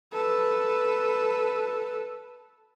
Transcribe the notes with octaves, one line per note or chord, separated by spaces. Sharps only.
A4 B4